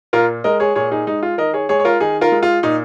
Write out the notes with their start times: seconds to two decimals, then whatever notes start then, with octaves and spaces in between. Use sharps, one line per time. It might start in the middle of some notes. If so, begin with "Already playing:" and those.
0.13 A#2 F4 A#4
0.44 G#3 A#4 D#5
0.60 G#4 C#5
0.75 A#2 G#4 C#5
0.91 D#4 G#4
1.07 G#3 D#4
1.23 F4
1.38 D#3 A#4 D#5
1.53 G#4 C#5
1.69 G#3 G#4 C#5
1.80 C#5
1.85 F4 A#4
2.00 D#3 D#4 G#4
2.21 F4 A#4
2.32 G#3
2.43 F4
2.63 A#2 D#4